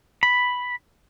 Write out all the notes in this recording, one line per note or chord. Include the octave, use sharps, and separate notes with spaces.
B5